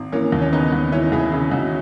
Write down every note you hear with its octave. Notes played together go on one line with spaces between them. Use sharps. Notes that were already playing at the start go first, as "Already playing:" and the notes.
Already playing: G#1
E3 A#3 C#4
D#2
C#4
C#3 B3 D#4
D#2
E3 C#4 E4
D#2 E4 G#4
C#3 E4 G#4
D#2 D#4 F#4